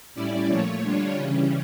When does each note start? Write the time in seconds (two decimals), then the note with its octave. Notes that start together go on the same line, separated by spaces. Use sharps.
0.15 A2 G3 C#4 E4 D5
0.48 A#2 F3 A3 C#5
0.81 D3 G3 D4 F4
1.13 C#3 E3 G3 C#4